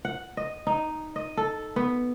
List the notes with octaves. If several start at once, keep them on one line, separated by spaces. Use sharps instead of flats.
F#5
D#5
D#4
D#5
A4
B3